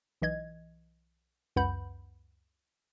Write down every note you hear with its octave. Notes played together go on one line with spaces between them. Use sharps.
B1 E3 D#5 G#6
C#2 F#2 B4 F#5 B5 G6